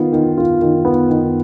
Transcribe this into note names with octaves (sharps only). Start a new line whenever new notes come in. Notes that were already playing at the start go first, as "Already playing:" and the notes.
Already playing: D#3 B3 F4
D#3
F4
D#3
B3
D#3